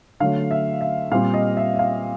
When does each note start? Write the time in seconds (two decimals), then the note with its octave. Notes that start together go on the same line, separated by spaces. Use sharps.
0.20 D3 F#3 A3 F5
0.51 E5
0.81 E5
1.12 A#2 G3 C4 F4 F5
1.34 D#5
1.57 E5
1.75 E5
1.79 F5